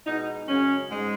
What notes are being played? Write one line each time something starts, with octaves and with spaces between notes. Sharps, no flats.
B2 G#3 D#4
F#2 C#3 G#3 C#4
G#2 G#3